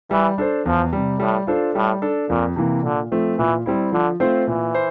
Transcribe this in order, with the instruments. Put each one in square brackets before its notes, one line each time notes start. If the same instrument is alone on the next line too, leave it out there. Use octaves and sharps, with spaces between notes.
[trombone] E3 [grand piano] G3
[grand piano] D4 A4 C5
[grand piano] E2 [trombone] F3
[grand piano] C3 G3
[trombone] A2 [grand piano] G3
[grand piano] D4 F4 A4 C5
[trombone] A2 [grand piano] G3
[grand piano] D4 A4
[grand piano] F2 [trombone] A#2
[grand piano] C3 E3 A#3
[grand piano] A#2 [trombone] D3
[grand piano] F3 A3 C4
[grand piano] A#2 [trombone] E3
[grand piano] G3 C4 E4
[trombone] D3 [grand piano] F3
[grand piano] A3 C4 F4 C5
[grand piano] A#2 [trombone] E3
[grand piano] C5